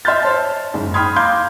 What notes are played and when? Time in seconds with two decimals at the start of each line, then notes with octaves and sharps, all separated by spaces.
0.05 D#5 E5 C6 F6 G6 A6
0.23 C5 C#5 A5
0.74 F#1 G#2
0.94 G5 B5 C6 D#6 F6 G#6
1.16 F5 A#5 C6 D6 G6 G#6